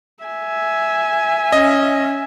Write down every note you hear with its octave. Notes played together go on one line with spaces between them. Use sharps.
E5 G#5
C#4 D#5